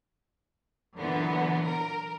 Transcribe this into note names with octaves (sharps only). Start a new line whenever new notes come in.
A#2 D3 E3 F#3 B3
A#4